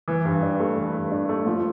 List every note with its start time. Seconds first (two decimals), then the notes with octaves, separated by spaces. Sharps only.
0.08 E3
0.25 G2
0.42 D4
0.60 A3
0.77 E3
0.94 G2
1.12 D4
1.29 A3
1.46 F3